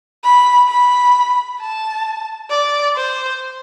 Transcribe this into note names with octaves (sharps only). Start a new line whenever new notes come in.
B5
B5
A5
D5
C5